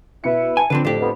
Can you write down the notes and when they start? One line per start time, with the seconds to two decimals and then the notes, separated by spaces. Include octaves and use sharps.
0.24 B2 E4 B4 E5 C#7
0.57 G#5 A5
0.70 D3 F3 C4 D4 B4
0.85 F2 A2 D4 G4
1.00 F2 B3